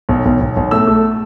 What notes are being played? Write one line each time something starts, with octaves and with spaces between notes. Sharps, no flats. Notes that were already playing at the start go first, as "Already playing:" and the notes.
B1
B1
B1
B1
A3 E6
A3